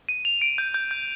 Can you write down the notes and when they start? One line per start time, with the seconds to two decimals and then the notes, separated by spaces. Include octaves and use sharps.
0.09 D#7
0.25 F7
0.42 D7
0.58 G6
0.74 G6
0.91 G6